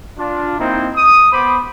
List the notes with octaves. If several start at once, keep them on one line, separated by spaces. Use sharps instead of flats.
D4 F4
A#3 C4 D#4 E4
D#6
B3 C5 B5 D6